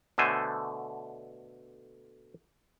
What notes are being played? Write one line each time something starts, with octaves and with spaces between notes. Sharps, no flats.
B2 D3 A3 C5 G#5